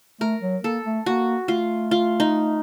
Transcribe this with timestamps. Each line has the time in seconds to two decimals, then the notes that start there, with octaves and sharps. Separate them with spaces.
0.21 A3 A#4
0.42 F#3
0.64 A#3 A4
0.85 A3
1.06 A#3 F#4
1.48 A3 F4
1.91 F4
2.20 D#4